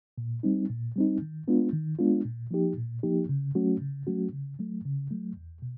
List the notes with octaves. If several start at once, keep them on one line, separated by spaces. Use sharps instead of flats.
A#2
G3 C4 D#4
A#2
G3 C4 D#4
D#3
G#3 B3 D4 F4
D#3
G#3 B3 D4 F4
A#2
F3 A#3 D#4 G4
A#2
F3 A#3 D#4 G4
C#3
F#3 A3 C#4 F#4
C#3
F#3 A3 C#4 F#4
C#3
F#3 A3
C#3
F#3 A3
E2
B2